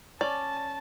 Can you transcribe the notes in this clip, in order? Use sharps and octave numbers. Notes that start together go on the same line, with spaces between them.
C#4 D5 A5